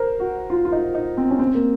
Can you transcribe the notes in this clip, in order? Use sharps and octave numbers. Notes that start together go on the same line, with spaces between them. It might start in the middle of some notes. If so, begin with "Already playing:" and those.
Already playing: A#4 C5
F#4
F4
F4
D#4
D#4
C4
C#4
C4
A#3